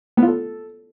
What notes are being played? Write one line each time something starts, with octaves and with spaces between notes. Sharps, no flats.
B3
F4
A4